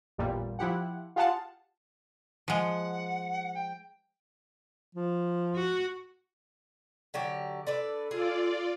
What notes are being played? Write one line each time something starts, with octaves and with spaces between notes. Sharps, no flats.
A1 E2 A#2 G3
F3 E4 G4 F#5
F4 G4 G#4 F5 F#5 A5
F3 G#3 F#5
G5
F3
F#4
D3 F#3 G4
D4 A4 B4 D5
F4 G#4 D5